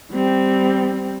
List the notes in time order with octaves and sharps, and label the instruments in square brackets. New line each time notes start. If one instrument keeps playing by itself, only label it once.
[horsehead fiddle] G3 C4